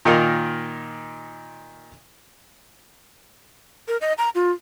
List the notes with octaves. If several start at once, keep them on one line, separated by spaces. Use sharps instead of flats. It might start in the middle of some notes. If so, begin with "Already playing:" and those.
A#2 D#3 D#4 F4 A#4
A#4
D#5
A#5
F4